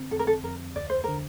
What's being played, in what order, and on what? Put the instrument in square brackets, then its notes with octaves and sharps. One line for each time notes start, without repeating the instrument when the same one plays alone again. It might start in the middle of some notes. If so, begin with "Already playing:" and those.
Already playing: [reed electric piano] D3 C4
[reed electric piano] F2 [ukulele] A4
[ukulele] A#4
A4
[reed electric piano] F2 [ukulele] A#4
[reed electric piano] D2 [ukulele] D5
[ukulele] C5
[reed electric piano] D3 [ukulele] A#4